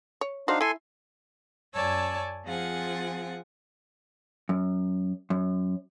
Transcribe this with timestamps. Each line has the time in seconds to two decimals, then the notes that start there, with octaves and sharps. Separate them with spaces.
0.21 C#5
0.48 D4 D#4 F#4 C5 F5
0.61 E4 A4 E5 G#5 C6
1.74 F#2 C#5 D5 G#5 A5 E6
2.45 F3 C4 F4 G#4 F#5 G#5
4.49 F#2
5.30 F#2